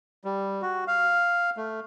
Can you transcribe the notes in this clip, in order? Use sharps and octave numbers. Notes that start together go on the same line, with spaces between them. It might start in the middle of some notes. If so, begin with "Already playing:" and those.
G3
F#4
F5
A3